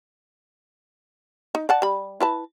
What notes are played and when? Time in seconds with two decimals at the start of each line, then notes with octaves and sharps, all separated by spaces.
1.55 D#4
1.69 D5 F#5 A5
1.82 G3 B5
2.20 E4 B4 A5